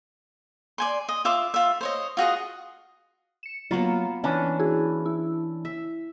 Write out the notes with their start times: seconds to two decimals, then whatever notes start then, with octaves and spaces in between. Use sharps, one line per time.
0.78 D5 G#5 C6
1.09 D#5
1.25 F4 E5 C6 D6
1.54 F4 E5
1.81 C5 C#5 D#5
2.17 F4 F#4 G#4 D#5
3.43 C#7 E7
3.71 F#3 A#3 B3 F4
4.24 E3 C#4 D4
4.59 E4 F#4 G#4
5.06 E4
5.65 E5